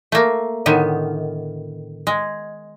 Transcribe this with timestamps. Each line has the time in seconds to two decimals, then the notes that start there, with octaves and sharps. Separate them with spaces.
0.12 A3 A#3
0.66 A2 D3 D#3 B3
2.07 G#3